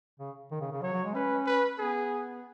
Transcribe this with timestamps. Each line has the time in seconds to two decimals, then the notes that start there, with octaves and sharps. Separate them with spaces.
0.20 C#3
0.51 D#3
0.61 C#3
0.72 C#3
0.82 F#3 C#5
0.93 F#3
1.04 G#3
1.15 C#4 B4
1.46 B4
1.78 B3 G#4